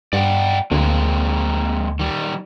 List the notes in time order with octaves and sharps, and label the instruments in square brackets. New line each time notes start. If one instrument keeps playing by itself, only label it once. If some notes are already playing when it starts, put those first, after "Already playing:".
[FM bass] G2 [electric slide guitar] D5 F#5 G5
[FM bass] D2 [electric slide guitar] G#3 A#3 C4
[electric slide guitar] D#3 G3